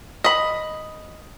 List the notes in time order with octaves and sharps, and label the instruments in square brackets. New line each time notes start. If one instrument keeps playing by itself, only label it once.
[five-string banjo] D#5 B5